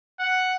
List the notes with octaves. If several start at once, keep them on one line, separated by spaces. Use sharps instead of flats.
F#5